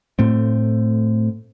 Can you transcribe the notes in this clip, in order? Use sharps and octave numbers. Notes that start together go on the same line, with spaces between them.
A2 A3 C4